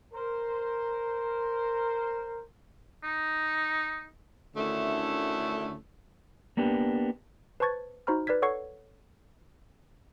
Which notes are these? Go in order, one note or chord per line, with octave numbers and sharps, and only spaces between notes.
A#4 C5
D#4
D2 D3 D#3 A3 C#4 E4
A#3 B3 D4 G4
B4 C5 A5 C#6 G#6 A6
D#4 F#4 C5 A#5 B5 F6
B4 D5 F6 G#6 B6
A4 C#5 F#5 C#6 G#6 C7